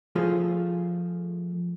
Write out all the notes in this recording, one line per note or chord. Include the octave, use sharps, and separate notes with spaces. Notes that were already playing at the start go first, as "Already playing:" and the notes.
F3 A3 F4 G#4 C5